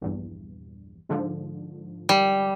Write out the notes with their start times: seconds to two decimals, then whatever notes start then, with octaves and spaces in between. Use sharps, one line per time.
0.01 A#1 E2 G2
1.09 G#2 D3 F3
2.09 G3